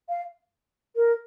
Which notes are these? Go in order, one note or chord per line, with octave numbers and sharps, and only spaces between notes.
F5
A#4